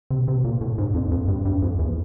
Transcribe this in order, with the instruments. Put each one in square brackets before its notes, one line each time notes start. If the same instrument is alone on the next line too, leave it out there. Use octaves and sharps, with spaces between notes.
[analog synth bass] C3
C3
A#2
A2
G#2
F2
F2
G2
G2
F2
E2